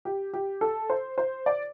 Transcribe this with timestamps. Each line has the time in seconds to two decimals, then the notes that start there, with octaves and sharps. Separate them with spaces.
0.05 G4
0.33 G4
0.61 A4
0.90 C5
1.18 C5
1.46 D5